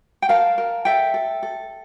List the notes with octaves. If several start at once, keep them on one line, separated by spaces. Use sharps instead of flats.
G5
A#4 F5 A5
A#4
A4 E5 G5
A4
A4